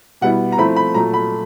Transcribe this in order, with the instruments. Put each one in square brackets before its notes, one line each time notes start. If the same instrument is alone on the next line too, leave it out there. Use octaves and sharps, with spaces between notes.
[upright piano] B2 G3 B3 E4 F#5
A#5
F3 A3 C4 E4 B5
B5
A#2 F#3 A3 A#5
B5